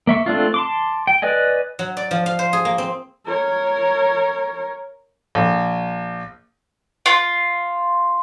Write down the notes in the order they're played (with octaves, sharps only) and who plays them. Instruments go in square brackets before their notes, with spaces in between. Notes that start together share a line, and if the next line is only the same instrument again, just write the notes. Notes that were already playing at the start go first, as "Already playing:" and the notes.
[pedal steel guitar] A#3 E5 C#6
A3 C4 D4 F4
A5 C6 D6
G5
B4 D5 D#5 G#5
[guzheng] F#3
D5
F3
F5
C5
G#4
A#3
C4
[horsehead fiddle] A#4 C#5
[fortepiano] A#1
[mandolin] F4